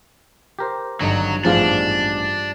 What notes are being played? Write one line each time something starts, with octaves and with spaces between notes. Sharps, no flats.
G4 A#4 C5
G#1 G2 D3 F#3 D#4
A1 G#2 F3 G#3 B3 D4 F5